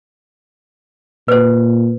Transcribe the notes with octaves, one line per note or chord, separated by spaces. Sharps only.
A#2 B4 C5